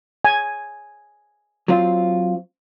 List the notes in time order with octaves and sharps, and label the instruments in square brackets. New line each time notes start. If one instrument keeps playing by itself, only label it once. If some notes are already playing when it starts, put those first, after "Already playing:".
[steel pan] G#5
[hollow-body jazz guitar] F#3 C4 F4